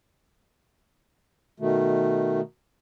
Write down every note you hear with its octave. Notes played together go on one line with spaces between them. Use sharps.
B2 D#3 A3